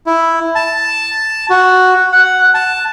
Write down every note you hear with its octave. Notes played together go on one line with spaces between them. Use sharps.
E4
A5
F#4
F#5
A5